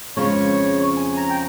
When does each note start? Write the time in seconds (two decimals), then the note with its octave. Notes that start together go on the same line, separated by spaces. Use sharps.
0.16 F2 C#3 F3 G#3 C#4 C#5
0.97 G#5
1.17 A#5
1.30 G5